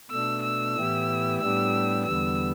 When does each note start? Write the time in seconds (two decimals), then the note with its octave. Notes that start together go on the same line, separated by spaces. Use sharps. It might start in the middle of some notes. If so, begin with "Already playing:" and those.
0.11 B2 A3 D4 E6
0.43 E6
0.75 A2 E3 B3 E4 G4
1.41 A2 G3 B3 D4 G4 E6
2.05 E2 D3 G3 B3 E6